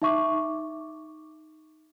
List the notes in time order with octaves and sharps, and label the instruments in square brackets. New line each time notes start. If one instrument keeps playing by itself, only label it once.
[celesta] D#4 E5 C#6 D6